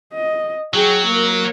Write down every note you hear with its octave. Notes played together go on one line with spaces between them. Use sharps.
D#5
F#3 G#4 G5
A#3 A#4